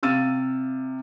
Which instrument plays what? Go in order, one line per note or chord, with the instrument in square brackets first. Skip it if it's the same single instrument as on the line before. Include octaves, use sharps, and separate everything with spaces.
[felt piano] C3 F5 E6 F6 A6 D#7